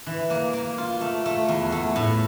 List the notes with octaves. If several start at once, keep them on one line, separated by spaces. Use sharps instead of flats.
E3
A#3
A#3
F4
A3
A3
E2
A3
A2